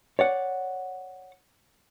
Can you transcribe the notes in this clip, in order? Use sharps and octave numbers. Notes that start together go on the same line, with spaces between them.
C#5 D5 F#5